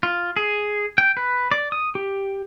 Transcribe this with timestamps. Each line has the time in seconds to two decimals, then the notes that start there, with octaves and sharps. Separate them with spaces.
0.03 F4
0.36 G#4
0.98 G5
1.17 B4
1.52 D5
1.72 D#6
1.95 G4